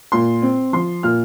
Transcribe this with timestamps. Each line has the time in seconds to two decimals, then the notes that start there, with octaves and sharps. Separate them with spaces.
0.12 A#2 C6
0.42 C4
0.73 F3 C6
1.03 A#2 F6